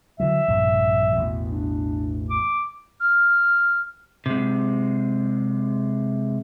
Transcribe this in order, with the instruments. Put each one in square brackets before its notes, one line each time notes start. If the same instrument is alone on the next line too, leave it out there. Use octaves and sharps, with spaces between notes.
[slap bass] D3 E3 F#3 [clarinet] E5
[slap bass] A#1 G2 C3
A1 E2 B2
[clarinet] D4
D6
[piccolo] F6
[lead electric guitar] C3 G#3